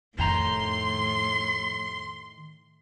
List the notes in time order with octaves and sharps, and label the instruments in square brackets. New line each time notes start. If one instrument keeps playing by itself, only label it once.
[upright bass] F2 [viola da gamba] A2 [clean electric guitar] D#3 G5 A#5 [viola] C6